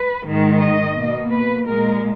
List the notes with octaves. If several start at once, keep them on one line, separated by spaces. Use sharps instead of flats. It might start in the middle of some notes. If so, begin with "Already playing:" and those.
Already playing: B4
G#2 D#3 G#3
D#5
B2 A#3
B4
A#2 G#3 A#4